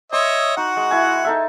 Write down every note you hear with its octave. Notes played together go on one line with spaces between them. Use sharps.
C#5 D#5 E5 C6
D#4 F#4 F#5
G#3
E4 G#5
D#4 A4 E5